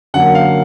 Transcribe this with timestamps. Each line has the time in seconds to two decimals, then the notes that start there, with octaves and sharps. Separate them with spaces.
0.14 F#2 D3 F#3 A#3 F#5
0.35 F5